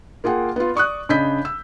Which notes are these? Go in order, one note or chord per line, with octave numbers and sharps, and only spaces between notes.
A#3 F4 G#4 F#5 G5
B3 F4
D5 C#6 D#6 F#6
C#3 D4 D#5 B5 G6 B6
E6